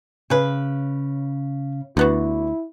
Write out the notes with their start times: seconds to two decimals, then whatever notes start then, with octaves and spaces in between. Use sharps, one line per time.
0.30 C#3 G#4 B4
1.97 D2 D3 B3 E4 F#4